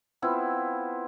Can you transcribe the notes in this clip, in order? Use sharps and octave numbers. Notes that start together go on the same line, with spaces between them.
B3 C4 E4 F4